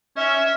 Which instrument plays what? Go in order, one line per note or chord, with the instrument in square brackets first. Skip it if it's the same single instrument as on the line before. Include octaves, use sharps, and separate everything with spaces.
[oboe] C#4 [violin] E5